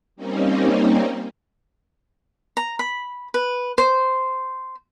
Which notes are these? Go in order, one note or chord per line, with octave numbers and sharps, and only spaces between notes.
G3 A#3 C4 C#4 D#4
A#5
B5
B4
C5